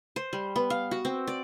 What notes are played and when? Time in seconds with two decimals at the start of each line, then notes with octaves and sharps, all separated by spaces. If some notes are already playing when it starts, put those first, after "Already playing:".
0.16 C5
0.33 G3
0.56 B3
0.70 F5
0.91 F#4
1.05 C4
1.28 D5